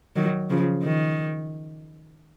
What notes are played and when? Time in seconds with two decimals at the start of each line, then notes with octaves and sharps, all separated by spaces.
0.16 D#3 F#3
0.50 C#3 F3
0.83 D#3